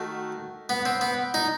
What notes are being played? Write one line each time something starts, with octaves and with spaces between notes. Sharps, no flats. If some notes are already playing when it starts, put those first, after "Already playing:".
Already playing: D#3 A3 F#4
B3
C4
B3
D#4